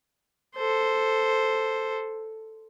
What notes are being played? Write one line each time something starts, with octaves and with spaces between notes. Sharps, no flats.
A4 C5